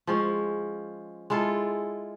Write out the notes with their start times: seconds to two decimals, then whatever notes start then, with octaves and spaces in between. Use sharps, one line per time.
0.07 F3 G#3 C#4
1.30 G#3 E4 F4 A4